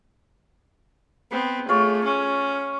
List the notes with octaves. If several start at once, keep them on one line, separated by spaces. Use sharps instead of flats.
B3 C4
A3 F4 G#4 C#5 D6
C#4